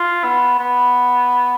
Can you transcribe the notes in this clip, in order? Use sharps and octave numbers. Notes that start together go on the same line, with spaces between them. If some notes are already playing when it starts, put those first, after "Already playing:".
Already playing: F4
B3
B3